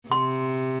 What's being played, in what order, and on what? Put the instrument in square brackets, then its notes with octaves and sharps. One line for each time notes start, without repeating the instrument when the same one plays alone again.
[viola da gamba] C3 [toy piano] C6